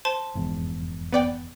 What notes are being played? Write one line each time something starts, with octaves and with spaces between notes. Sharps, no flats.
C5 A5 C6
F1 E2 G#2
B3 D5 G5